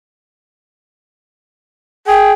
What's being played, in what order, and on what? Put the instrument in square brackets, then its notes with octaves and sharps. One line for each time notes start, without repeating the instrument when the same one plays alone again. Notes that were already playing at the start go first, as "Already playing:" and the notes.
[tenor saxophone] G#4 [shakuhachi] G5